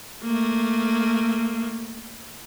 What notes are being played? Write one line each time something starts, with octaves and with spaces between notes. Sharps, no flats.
A3 A#3